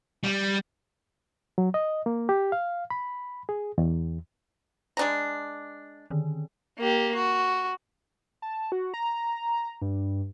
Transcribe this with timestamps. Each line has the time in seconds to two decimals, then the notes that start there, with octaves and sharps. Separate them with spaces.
0.24 G3
1.58 F#3
1.74 D#5
2.06 A#3
2.29 G4
2.52 F5
2.90 B5
3.49 G#4
3.78 E2
4.97 G#3 D4 A#5
6.10 D3 D#3
6.78 A#3 G4
7.15 F#4
8.42 A5
8.72 F#4
8.94 A#5
9.82 G2